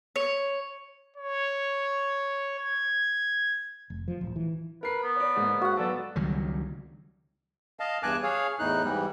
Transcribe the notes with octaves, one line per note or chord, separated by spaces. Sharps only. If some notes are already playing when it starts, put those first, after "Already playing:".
C#5
C#5
G#6
F1
F3
D1
E3
A#4 B4 C7
B3
C#5 D5
G#2 G#3 A#3
F#4 F#5
F#3 B3 A4 D5
C#2 D#3 F#3 G3
D#5 F5 A5
E2 G2 G#5 A5 D6 F#6
G#4 C#5 F5
E2 A2 D#4 F#6
G#2 E3 G3